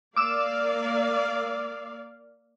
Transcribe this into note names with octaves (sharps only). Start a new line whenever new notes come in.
A#3 D5 F5 D6 E6